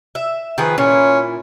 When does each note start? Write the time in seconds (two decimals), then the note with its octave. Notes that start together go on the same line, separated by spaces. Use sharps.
0.15 E5
0.58 D#3 F3 G#4 B4
0.78 A#2 C#4 E4